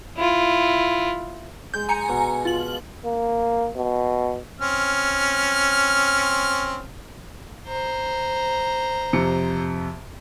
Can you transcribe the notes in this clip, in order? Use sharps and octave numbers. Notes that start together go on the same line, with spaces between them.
E4 F4
G#3 G6
G#5 A#5 C#7
B2
F4 F#7
A#3
B2
C4 C#4 F6
C5 A#5
F2 C3 C#7